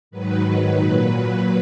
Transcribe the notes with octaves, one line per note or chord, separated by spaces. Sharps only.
G#2 D#3 F#3 B4
B4
A#2 F#3